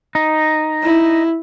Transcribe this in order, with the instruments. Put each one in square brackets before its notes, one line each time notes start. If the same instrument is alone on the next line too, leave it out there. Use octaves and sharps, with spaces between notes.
[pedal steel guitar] D#4
[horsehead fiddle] E4